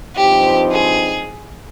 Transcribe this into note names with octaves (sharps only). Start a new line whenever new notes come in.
G2 F3 C4 D#4 G4
G#4